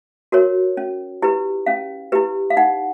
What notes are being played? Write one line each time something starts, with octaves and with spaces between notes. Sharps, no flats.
F#4 A#4 C#5
C#4
E4 G4 B4
C#4 F5
E4 G4 B4
F5
D#4 F#5